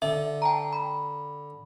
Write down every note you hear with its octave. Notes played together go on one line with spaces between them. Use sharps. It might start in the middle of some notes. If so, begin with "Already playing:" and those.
D3 E5
G5 A5 A#5
B5